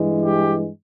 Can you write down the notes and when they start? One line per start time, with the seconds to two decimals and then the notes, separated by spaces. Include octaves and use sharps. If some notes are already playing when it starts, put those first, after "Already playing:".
Already playing: G2 E3 G#3
0.22 G4